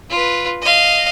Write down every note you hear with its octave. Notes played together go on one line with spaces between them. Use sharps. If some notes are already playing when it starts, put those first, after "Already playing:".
F4 B4
D#5 F5